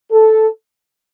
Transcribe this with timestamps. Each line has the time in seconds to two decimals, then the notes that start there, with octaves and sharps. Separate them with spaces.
0.12 A4